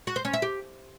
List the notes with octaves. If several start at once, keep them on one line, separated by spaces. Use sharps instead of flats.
F#4
C5
C#4
E5
G4